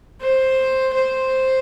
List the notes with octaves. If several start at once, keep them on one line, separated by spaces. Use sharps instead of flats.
C5
C5